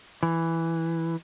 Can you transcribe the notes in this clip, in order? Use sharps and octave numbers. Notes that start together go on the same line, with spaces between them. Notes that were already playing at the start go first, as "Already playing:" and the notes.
E3